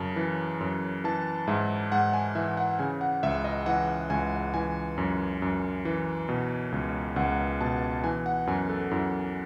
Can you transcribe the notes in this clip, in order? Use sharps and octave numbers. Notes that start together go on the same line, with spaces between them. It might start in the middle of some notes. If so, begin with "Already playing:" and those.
Already playing: F#2 C#3 A5
E3
F#2
E3 A5
G#2 E5
G#2 F#5
G#5
E3 E5
F#5
C#3 G#5
F#5
C#2 E5
D#5
E3 F#5
C#2 G#5
E3 G#5
F#2
F#2
E3
B2
C#2
C#2 F#5
B2 A5
E3 G#5
F#5
F#2 G#5
A4
F#2 E4